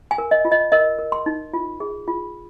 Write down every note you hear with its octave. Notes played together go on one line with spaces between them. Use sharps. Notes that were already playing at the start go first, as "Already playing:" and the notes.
G#5
A#4
D#5
F4
D#5
A#4 D#5
A#4
C6
D#4
F4
G#4
F4